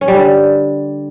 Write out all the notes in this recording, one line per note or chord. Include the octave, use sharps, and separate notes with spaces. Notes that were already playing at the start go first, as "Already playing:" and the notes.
C#4
G3
D3